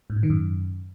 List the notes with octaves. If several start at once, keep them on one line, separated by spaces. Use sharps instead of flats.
G#2
A2
D#3
F#2